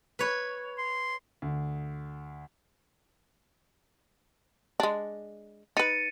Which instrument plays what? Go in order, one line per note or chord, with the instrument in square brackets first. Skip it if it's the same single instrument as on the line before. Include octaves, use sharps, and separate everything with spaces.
[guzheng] B4 C#5
[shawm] C6
[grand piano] D2
[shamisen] G#3 D4
[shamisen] D#4 B4 [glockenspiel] A6 C#7 D#7